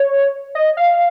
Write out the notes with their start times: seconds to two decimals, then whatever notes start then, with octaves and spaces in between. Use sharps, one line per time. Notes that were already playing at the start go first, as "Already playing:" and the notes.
Already playing: C#5
0.55 D#5
0.77 F5